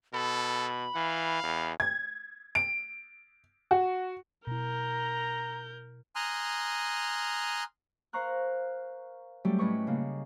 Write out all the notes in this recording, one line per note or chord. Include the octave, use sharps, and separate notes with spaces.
B2 A4 B5
E3 F5
E2
G#6
D7
F#4
B2 E4 A#4 A#5 G6
G#5 A#5 C6 D#6 F6 F#6
A#4 C5 F5 A#5 C#6 F#6
F#3 G3 A3 C#4 F#4 G4
A2 C#4 B4 D#5 C#6
C#3 A#3